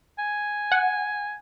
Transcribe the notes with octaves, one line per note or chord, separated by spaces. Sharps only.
G#5
F#5